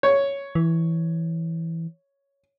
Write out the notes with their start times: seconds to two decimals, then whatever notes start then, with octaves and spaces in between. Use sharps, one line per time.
0.03 C#5
0.55 E3